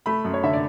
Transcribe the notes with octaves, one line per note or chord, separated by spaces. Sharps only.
A3 B5
F#2
C#5
D3 E5
D5